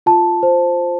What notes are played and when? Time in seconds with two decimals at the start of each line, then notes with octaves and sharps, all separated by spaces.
0.06 F4 A5
0.43 C5